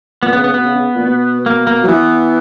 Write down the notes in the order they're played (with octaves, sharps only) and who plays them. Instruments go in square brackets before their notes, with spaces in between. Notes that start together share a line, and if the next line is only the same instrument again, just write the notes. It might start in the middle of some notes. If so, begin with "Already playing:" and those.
[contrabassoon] A#2 [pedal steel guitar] B3
[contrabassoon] C#3 [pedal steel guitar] B3
[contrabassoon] C#3 [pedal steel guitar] B3
[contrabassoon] B2 [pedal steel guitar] B3
[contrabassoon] C#3
C#3
A#2
B2
[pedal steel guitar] A#3
A#3
[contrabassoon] F#3
[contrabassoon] E3 [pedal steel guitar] B3